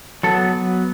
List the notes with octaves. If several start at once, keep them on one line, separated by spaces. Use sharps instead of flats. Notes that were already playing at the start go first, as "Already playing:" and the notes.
F#3 B3 A4